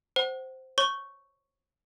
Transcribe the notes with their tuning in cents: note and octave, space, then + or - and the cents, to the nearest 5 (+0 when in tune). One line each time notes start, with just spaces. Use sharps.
C5 +0 F#5 +30
C#5 -20 C#6 +0